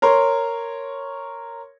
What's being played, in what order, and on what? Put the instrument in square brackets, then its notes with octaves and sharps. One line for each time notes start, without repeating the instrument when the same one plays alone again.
[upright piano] A#4 C#5 C6